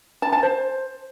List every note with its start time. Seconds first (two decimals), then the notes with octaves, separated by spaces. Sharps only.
0.22 A5
0.32 A5
0.43 C5